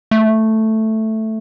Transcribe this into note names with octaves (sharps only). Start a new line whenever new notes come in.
A3